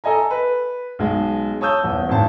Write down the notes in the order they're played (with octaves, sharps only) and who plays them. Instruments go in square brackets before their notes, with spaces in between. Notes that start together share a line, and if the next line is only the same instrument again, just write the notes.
[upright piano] A4 D#5 G#5 A#5
B4
B1 G#3
C#5 A5 D#6 E6 G6
D#1 E2
G#1 A2 C4 A5